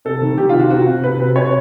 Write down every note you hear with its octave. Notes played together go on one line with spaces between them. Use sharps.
C3 A4
D#3
D#3 G4
C3 F4
F#4
C3 F#4
C3
C3 B4
C3
C3 C#5